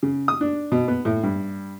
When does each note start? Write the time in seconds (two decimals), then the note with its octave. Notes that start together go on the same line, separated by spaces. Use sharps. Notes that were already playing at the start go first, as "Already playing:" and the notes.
0.03 C#3
0.28 D#6
0.41 D4
0.72 B2
0.88 B3
1.05 A2
1.23 G2